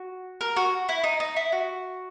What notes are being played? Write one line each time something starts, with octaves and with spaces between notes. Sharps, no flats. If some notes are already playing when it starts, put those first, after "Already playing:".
Already playing: F#4
A#4
F#4
E4
D#4
D#4
E4
F#4